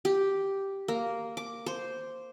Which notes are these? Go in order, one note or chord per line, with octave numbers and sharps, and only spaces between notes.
G4
A#3
D6
C5